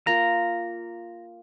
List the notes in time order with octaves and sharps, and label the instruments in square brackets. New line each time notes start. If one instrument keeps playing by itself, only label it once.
[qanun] A#3 F4 [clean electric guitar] A#5